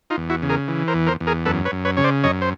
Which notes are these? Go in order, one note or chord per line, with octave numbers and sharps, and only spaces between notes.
D#4 F4
E2
E4 F#4
C#3
G#4 A#4
E3
A#4 C5
E2
A#4 C5
E2
G#4 A#4
F#2 A4 B4
B4 C#5
F#2
B4 C#5
C#3 C#5
C5 D5
F#2 C#5 D#5
C5